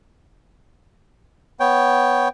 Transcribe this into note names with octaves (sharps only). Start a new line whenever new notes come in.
B3 C#5 G5